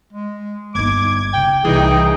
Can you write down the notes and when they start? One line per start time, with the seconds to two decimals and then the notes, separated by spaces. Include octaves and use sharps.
0.13 G#3
0.75 G1 D#4 D6 G#6
1.34 C#3 G5
1.65 C2 E3 D#4 G#4 G5